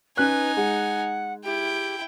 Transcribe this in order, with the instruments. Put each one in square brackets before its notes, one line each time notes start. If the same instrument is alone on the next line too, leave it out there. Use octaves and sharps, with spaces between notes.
[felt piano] C#4 F#6 [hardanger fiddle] D#4 G#5 [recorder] B4
[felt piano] G#3 [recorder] F#5
[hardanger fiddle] E4 G5 [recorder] G4